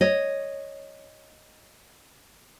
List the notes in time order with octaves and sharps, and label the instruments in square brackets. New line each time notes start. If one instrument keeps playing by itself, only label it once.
[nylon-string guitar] C#5 D#5